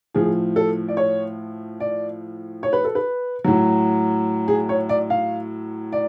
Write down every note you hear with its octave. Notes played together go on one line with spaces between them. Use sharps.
A2 F3 G#4
A4
D5
C#5
D5
C#5
B4
A4
B4
A2 F#3
G#4
C#5
D5
F5
D5